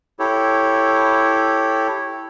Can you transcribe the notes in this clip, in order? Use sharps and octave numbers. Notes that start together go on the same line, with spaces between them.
E4 G4 A4 C#5